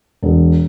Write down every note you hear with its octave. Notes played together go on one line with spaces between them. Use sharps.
E1